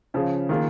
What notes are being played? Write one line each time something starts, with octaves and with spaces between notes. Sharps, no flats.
C#3 F3 C#4 G#4
D#3 A#3 F4 G#4